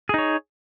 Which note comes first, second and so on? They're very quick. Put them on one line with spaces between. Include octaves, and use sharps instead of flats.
G#4 D#4 C#5